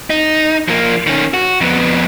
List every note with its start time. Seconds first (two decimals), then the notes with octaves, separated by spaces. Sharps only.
0.10 D#4
0.68 F3 A#3
1.07 D#3 C#4
1.34 F#4
1.61 F2 B3